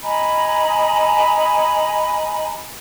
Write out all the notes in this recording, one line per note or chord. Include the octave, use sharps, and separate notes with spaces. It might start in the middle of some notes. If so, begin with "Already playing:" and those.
D#5 G#5 A#5 B5